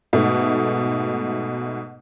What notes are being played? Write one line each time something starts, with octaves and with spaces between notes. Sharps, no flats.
G#2 B2 A3